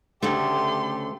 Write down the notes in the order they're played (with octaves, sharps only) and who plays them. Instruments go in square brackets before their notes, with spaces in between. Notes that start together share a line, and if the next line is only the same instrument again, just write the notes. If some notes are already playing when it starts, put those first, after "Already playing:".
[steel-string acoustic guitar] D2 C#3 A3 [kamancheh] G4 [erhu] C6